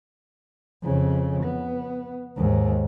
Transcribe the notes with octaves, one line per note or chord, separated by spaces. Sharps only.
F2 C#3
B3
D#2 G#2